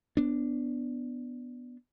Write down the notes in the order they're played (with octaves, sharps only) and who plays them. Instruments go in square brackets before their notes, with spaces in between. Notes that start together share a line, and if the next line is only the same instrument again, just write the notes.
[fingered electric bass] B3 D4